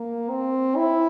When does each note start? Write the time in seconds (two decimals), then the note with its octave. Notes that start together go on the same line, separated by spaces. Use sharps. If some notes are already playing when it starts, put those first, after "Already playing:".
Already playing: A#3
0.30 C4
0.77 E4